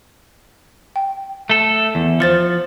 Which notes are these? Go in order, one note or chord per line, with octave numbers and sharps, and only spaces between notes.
G5
A3 A4
E2
F3 C5 A6 C#7